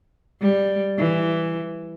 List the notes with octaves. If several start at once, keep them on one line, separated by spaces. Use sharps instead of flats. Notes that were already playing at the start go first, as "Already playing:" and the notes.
G3
E3